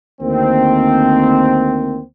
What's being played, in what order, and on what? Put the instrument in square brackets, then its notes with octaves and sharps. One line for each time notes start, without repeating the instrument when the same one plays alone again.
[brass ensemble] D2 D#3 A#3 C4